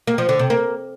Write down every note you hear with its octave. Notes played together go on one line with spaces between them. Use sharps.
A#3
F3
D3
C3
A#3